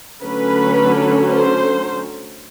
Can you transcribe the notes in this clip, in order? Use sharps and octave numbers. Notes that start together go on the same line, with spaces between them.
D3 F#3 A3 C#4 B4
C5